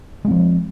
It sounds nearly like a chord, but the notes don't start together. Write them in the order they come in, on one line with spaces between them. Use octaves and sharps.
G#3 C4 F3